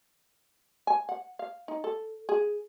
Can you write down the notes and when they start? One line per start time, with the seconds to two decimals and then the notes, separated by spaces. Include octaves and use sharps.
0.87 G#5
1.09 F#5
1.39 F5
1.68 D#4
1.84 A4
2.29 G#4